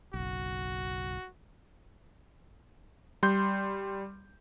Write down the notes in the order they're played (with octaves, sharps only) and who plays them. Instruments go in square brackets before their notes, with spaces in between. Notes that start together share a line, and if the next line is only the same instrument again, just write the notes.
[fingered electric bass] F#1 B1 [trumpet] F#4
[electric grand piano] G3 C6 G6